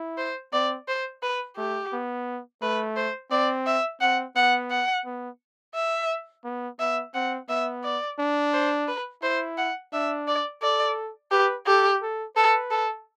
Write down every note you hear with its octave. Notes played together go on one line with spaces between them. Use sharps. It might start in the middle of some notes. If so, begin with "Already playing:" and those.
Already playing: E4
C5
C4 D5
C5
B4
A3 G4
B3
A3 B4
C5
C4 D5
E5
C4 F#5
B3 F#5
F#5
B3
E5
B3
B3 E5
C4 F#5
B3 E5
D5
D4
C5
B4
E4 C5
F#5
D4 E5
D5
A4 D5
G4 B4
G4 A4
A4
A4 B4
A4